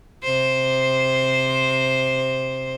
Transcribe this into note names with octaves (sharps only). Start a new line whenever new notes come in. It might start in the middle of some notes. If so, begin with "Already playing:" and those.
C3 C5